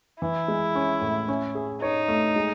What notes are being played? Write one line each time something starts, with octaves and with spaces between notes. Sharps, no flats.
E3 E4
G#3
C#4
A2
C#4
G#4
D#4 C#5
A3
G#3